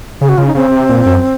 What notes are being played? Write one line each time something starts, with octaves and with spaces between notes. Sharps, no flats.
C#3 G#4
F#4
C#3 F4
D#4
C#3 C4
C3
A#2
F#2